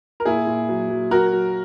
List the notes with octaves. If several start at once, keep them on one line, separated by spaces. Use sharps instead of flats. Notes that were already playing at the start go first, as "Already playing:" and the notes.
A#4
A#2 E4 G#4
A#2
F#3
F#3
F#3 F#4 A#4
F#3